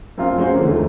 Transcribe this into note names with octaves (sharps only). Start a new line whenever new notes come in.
F#2 C4 D4 F4
G#3 C#4 F#4 C5
D3 E3 F3 G#3 A#3
D#2 A3